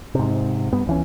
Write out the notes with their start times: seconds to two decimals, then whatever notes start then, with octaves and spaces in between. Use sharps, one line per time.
0.15 G#2 C3
0.73 G2 B3
0.87 C#2 E3 C#4